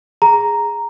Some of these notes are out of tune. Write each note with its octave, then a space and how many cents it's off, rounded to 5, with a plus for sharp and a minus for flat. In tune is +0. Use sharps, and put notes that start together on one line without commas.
G#4 +0 A#5 +0